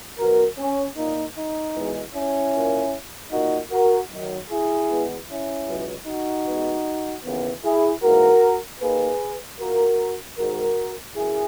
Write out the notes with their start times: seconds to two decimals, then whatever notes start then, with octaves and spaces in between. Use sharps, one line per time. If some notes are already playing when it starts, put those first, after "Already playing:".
0.17 B2 F#3 B3 F#4 A#4
0.57 C#4
0.96 A#2 A#3 D#4
1.35 D#4
1.74 E2 B2 G#3
2.14 C#4 E4
2.54 A#2 A#3
3.31 A#2 D#4 F#4
3.36 A#3
3.71 F#4 A#4
4.09 F#2 D#3 F#3
4.49 E4 G#4
4.88 E2 B2 G#3 B3
5.28 C#4 E4
5.66 C#2 B2 F#3 B3
6.06 D#4 F#4
6.45 B2 G#3 B3
7.23 D#2 C#3 E3 B3
7.63 E4 G#4
8.02 G#2 E3 A#3 F#4 A#4
8.80 D#2 D#3 A#3 G#4 B4
9.59 A#2 A#3 F#4 A#4
10.37 G#2 D#3 G#3 F#4 A#4
11.16 F#2 E4 G#4